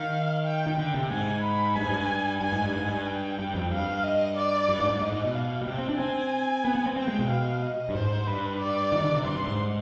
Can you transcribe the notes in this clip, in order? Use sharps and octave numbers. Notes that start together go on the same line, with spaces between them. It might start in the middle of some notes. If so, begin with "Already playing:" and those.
Already playing: D#3 F5
G5
D#3
D3 G5
C3
G#2 G#5
B5
G2 G#5
G#2
G2
G2 G#5
G#2
G2
G#2 G#5
G2
G5
G2
F2
G2 F5
D#5
D5
G2
G#2
G#2
G#2 D#5
G#2
B2
F5
B2
C3 G5
C4
D4
C4 G#5
B3
B3
C4
C4 G5
G#3
B2
F5
D#5
G2
G#2 C5
G2 B4
D5
D#3
D3
C3
G2 C6
G2
G#2